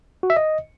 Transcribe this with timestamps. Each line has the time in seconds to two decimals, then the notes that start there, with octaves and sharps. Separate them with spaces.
0.23 F#4
0.30 E5
0.37 D#5